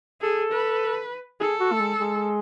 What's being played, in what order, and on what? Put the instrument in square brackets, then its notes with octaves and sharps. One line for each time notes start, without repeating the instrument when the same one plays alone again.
[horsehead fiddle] G#4 [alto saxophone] A4
[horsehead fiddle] B4
[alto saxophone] G#4 [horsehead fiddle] A4
[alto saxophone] F#4
A3
G#3
G#3